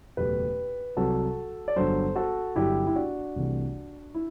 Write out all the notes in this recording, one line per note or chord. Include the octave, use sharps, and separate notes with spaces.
F#1 E2 B2 F#3 A3 G4 B4
C2 C3 F#3 F#4 A4
D5
G1 G2 F#3 A4 C5
F#4 A4
G1 G2 D3 F#3 E4 G4
E4
D4 F#4
C2 C3 E3 A3
E4